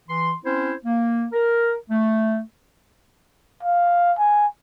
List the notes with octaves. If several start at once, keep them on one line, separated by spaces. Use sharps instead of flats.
E3 C6
C4 C#4 E4 C5
A#3
A#4
A3
F5
G#5